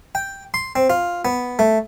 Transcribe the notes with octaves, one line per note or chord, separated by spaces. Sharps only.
G5
C6
C4
F4
B3
A3